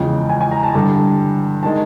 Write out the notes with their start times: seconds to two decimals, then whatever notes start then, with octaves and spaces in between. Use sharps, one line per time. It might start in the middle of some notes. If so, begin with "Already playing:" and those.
Already playing: E2 C#3 F3 G#3 G5
0.30 G#5
0.41 G#5
0.51 A#5
0.63 A5
0.73 G2 D3 G3
1.63 D#3 G#3 A5